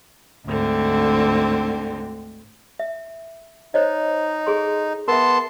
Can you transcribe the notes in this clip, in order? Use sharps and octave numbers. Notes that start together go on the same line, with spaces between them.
D2 G#2 D3 C4
E5
D#4 C5 C#5 D#5
G#4 A4 C6
B3 A#4 E5 A5 C6